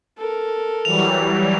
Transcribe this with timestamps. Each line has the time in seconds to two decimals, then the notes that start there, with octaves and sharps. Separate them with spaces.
0.17 A4 A#4
0.85 E3 F#3 G3 F7